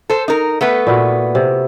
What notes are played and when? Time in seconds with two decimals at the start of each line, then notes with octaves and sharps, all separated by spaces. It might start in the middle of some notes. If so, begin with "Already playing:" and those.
0.10 A4 C5
0.28 D#4 A#4
0.61 A3 B3 B4
0.87 A#2 E4 F#4
1.35 C3